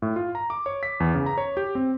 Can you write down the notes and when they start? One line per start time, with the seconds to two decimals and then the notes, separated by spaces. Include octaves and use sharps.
0.02 A2
0.16 F4
0.35 A#5
0.50 D6
0.66 C#5
0.83 B6
1.00 E2
1.15 C#3
1.26 A#5
1.38 C#5
1.57 G4
1.75 C4